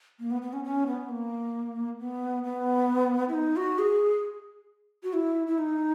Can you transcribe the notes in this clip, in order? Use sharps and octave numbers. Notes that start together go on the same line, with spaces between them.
A#3
B3
B3
C#4
C#4
B3
A#3
B3
B3
E4
D#4
F#4
G#4
F#4
E4
E4
D#4